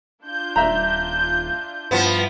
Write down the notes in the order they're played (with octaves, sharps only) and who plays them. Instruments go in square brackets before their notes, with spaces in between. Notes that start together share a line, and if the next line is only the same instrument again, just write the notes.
[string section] D4 F4 G6
[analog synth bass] D#1 [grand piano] D5 E5 A#5
[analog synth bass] G2 [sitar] F3 B3 [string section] E4